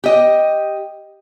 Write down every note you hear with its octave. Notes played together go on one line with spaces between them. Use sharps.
G4 D#5